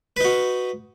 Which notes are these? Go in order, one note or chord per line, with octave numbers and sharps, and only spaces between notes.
D#4 F#4 B4